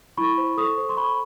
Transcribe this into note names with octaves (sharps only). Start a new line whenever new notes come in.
E4 B5 C#6
C5
A4 C#6 D#6
C5
C6
A4 B5 C#6